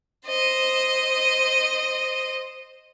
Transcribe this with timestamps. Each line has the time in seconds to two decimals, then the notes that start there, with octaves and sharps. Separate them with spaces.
0.27 C5 D#5